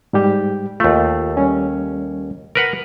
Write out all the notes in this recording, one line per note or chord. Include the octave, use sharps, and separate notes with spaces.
G#2 G3 G4
D#2 A3 F4
G3 C#4
A#4 B4 F#5